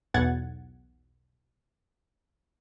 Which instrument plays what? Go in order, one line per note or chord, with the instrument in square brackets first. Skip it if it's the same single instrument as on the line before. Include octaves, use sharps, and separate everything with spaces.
[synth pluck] B1 E2 E3 F#5 G#6 A6